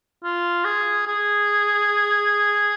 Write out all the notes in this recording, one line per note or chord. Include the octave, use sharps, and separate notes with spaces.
F4
G#4
G#4